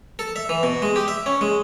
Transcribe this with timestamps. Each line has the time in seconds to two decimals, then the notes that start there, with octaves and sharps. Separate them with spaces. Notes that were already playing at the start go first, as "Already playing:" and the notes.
0.19 A4
0.36 E5
0.49 E3
0.63 B2
0.82 G#3
0.96 G4
1.08 E5
1.26 C#4
1.41 G#3